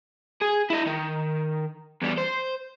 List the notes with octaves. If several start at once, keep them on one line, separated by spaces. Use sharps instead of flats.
G#4
E4 D#5
D#3
E2 G3
C5